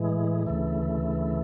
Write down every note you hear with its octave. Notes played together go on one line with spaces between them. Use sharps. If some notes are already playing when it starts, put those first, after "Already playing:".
Already playing: A2 E3 G#3
D2 C#3 E3 A3